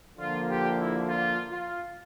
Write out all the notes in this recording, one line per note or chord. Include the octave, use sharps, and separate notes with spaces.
D3 F3 A#3 F4
G4
E4
F4
F4